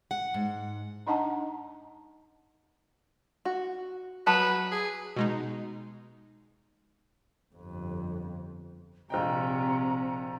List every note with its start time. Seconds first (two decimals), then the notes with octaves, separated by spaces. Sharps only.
0.11 F#5
0.34 G#2
1.07 D4 D#4 D#5 F#5 A5 A#5
3.45 F#4
4.27 F#3 B4 A5
4.72 G#4
5.17 B2 G#3 D#4
7.54 G1 F2
9.10 A#1 C3 D#5 G5 A#5